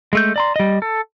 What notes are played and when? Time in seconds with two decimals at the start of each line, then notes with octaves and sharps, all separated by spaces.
0.13 G#3 A3 G6
0.36 D5 A#5 C6
0.56 G3 D#5
0.82 A4